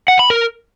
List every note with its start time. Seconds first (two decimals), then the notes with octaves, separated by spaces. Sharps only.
0.08 F#5
0.19 B5
0.30 A#4